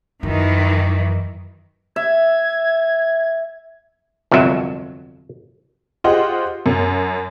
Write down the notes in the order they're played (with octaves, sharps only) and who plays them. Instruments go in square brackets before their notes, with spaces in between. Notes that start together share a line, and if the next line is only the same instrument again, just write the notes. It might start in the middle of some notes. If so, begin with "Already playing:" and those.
[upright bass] F#2 [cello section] D#3 E3
[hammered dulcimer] E5 [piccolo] G#6
[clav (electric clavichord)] G1 C2 F2 F#3 E5
[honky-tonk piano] F4 G4 G#4 C5 D#5 F#5
F#2